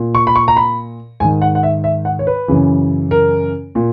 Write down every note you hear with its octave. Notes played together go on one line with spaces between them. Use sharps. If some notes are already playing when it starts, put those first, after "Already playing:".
Already playing: A#2
C#6
B5
C#6
A#5
B5
G#2 D#3 G#5
F#5
F#5
E5
E5
F#5
C#5
B4
F#2 C#3 E3
A#4
A#2